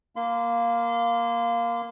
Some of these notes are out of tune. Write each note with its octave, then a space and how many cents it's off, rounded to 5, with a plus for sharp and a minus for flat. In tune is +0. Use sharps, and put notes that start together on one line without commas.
A#3 +5 F5 +0 C6 -35